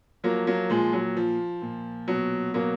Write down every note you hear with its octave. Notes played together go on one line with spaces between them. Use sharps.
F3 F#3 A#3
F#3 A#3
A#2 F3 G#3
F#3
F3
A#2
B2 F#3
B2 F#3 A#3